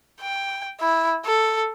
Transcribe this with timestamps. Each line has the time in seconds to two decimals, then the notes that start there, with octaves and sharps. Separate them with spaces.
0.21 G5
0.80 E4
1.25 A4